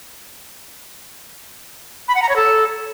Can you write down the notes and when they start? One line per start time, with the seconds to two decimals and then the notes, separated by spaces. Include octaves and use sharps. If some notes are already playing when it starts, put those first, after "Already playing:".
2.08 B5
2.15 F#5
2.22 A#5
2.29 C#5
2.36 A4